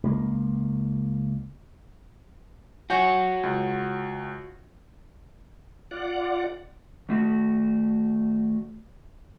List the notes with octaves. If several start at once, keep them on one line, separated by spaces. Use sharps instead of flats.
C#2 A#3
F#4 C#5 F#5 G#5 G6
C#2
F4 D5 F#5
D#3 A3 F#4